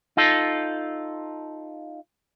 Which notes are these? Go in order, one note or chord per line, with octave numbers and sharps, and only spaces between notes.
D#4 F4 A4